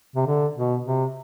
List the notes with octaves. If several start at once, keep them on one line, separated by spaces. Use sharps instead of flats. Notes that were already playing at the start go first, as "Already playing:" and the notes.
C3
D3
B2
C3